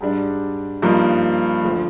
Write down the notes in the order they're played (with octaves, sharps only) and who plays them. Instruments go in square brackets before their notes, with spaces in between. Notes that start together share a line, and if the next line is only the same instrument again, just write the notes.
[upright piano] G#2 G3 D4
G2 F3 A#3 D#4
D2 D3 F3